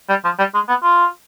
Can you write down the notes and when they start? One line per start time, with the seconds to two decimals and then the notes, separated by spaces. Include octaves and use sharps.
0.09 G3
0.25 F3
0.39 G3
0.55 G#3
0.69 B3
0.83 F4